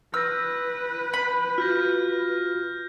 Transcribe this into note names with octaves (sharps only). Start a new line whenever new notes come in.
B4 E6 F6 G6 A#6
B5
F4 F#4 F6 G6 A#6